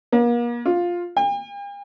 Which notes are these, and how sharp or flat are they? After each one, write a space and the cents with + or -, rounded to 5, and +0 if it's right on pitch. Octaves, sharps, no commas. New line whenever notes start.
A#3 +40
F4 +5
G5 +45